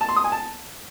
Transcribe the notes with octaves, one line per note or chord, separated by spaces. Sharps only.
A5
C6
D#6
G#5
A5